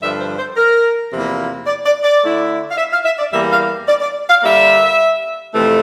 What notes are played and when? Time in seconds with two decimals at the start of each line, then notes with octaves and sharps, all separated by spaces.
0.02 G2 D3 F3 E5
0.20 C5
0.38 C5
0.57 A#4
1.13 E2 C3 F3 A#3 E4
1.67 D5
1.86 D5
2.04 D5
2.23 D3 A3 E4
2.71 F5
2.77 E5
2.92 F5
3.05 E5
3.19 D5
3.32 E2 E3 G3 A#3 E5
3.52 F5
3.89 D5
4.01 D5
4.30 F5
4.43 D3 G3 A#3 E5
5.54 F2 C3 E3 A3